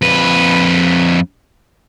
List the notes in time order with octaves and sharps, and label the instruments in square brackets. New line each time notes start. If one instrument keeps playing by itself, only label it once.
[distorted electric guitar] F2 B4